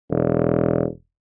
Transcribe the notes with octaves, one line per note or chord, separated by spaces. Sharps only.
E1